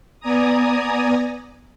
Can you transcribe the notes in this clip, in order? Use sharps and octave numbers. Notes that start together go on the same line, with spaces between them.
B3 D5 G#5 A#5 D#6